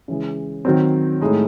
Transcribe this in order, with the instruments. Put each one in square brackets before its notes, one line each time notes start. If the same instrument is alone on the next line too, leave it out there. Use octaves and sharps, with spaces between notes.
[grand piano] C#3 E3 G#3
D#3 F#3 C4
A2 G#3 D#4